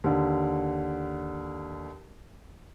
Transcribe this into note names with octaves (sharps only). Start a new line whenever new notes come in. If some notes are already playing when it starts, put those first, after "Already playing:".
D#2 D3